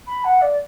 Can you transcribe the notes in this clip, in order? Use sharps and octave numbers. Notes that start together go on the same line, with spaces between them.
B5
F#5
D5